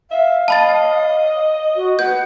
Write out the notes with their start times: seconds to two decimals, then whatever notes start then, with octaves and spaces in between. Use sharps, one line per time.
0.11 E5 F5
0.48 D#5 A5 B5 A6
1.76 F#4
1.99 B4 F#5 G6